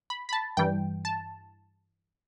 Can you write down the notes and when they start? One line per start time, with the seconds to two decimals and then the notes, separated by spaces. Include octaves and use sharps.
0.10 B5
0.29 B5
0.33 A5
0.57 G2 E3 G3 G5
1.05 A5